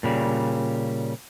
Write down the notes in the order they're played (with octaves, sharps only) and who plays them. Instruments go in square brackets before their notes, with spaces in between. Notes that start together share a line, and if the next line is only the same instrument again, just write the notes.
[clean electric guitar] A#2 C#3 G3